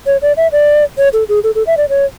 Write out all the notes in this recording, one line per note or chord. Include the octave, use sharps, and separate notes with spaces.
C#5
D5
E5
D5
C#5
A4
G#4
A4
A4
E5
D5
C#5